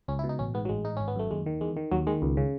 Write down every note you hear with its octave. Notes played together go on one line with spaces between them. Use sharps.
C#2 C#4
E4
B2
D#4
A1 C#4
G#2 B3
F#3
A1 G#3
G#2 D#4
G#1 C#4
B3
F#2 A3
D#2 G#3
D#3
E2 G#3
D#3
D#2 F#3
D#3 G#3
C#2
C#3